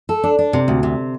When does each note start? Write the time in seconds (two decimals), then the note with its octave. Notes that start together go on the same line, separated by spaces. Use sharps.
0.09 A4
0.24 D4
0.39 D4
0.53 C3
0.68 D2
0.83 C3